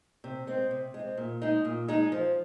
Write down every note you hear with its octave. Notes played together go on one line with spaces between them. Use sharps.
C3
G#3 C4
C3
G#3 C4
A#2
G#3 D#4 G#4
A#2
G#3 D#4 G#4
F3